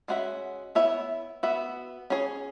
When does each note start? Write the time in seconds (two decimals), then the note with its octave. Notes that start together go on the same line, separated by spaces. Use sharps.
0.08 G#3 C#4 F#4 B4 E5
0.75 B3 E4 C#5 E5
1.43 B3 F#4 E5
2.10 C#4 G#4 C#5